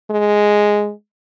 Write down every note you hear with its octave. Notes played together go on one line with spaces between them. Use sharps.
G#3